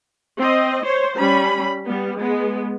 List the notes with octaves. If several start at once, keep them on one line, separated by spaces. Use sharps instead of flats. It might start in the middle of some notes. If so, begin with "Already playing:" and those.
C4 D#5
C5 C#5
G3 C#4 B5
G3 B3
G#3 B3